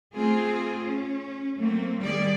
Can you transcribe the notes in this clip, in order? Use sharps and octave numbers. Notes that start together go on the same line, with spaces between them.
A3 C4 F4 G#4
C#4
F#3 A3 A#3 C4
D#3 G3 G4 G#4 D5